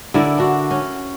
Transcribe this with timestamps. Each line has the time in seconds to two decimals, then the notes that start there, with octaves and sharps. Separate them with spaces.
0.14 D3 E4 A#4 D5
0.38 D4 F#4
0.71 C#4